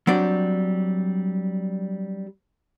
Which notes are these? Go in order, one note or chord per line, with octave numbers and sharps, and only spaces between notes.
F#3 G3 C4 D4 D5